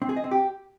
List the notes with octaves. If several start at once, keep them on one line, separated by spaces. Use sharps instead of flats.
C4
G#4
D#5
C4
G4